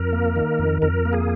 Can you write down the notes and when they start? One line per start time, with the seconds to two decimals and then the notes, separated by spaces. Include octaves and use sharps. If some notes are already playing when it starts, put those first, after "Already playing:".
Already playing: F2 A#4
0.13 A#3
0.36 D#3
0.59 F2
0.82 F2 A#4
1.05 A#3
1.13 G#4